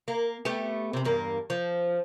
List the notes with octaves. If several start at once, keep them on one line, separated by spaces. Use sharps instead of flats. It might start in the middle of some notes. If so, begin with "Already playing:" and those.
A#3
A3 B3 G4
C3 C4
E2 G2 A#3
F3